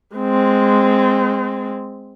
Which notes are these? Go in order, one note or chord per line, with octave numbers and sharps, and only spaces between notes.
G#3 C4